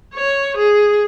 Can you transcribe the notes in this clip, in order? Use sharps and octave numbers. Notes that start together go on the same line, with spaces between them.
C#5
G#4